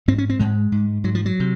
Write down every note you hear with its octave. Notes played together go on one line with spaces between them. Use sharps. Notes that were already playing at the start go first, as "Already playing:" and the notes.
G#2 C4
C#4
C4
G#2 G#3
G#2
G#2 F#3
F3
F#3
C3